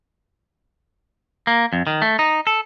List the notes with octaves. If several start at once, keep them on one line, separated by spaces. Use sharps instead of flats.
A#3
F2
D#3
A3
D#4
A4